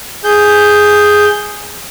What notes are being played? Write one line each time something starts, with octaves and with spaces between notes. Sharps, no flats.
G#4 G6